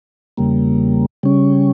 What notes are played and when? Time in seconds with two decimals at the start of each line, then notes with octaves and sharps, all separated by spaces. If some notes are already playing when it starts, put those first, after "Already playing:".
0.37 E2 C#3 G3 A#3
1.23 C#3 G3 C#4